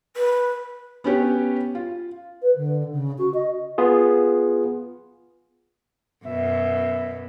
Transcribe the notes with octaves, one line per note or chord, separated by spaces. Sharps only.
B4
B3 C#4 G4 C#5
F4
B4
D3
C#3
F#4
D#5
B3 F4 G#4
F#2 B2 E5